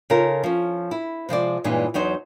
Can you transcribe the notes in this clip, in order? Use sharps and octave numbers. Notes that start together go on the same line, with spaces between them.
C#3 C#4 D#4 F4 A4 A#4
F3 C#4
E4
C3 F3 G#3 D5
G2 A#2 E3 G#3 C#4 D#4
E2 F#3 D#4 C5